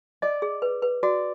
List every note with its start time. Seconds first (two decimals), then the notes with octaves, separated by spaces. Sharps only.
0.22 D5 D#5
0.42 G#4
0.62 B4
0.82 B4
1.03 F#4 D5